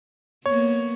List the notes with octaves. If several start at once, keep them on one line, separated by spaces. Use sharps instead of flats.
A#3 B3 C#5